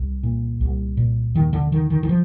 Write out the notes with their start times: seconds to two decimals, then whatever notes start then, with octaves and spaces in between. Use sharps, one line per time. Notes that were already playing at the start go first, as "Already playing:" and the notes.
Already playing: C2
0.23 A#2
0.61 C2
0.97 A#2
1.35 D#2 D#3
1.53 D3
1.72 D3 D#3
1.90 D#3
2.03 D#3
2.09 F3